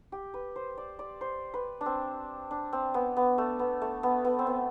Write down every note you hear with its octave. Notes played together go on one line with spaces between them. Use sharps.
G4
B4
C5
D5
D5
C5
B4
D4
C4
D4
C4
B3
B3
A3
B3
A3
B3
B3
C4
B3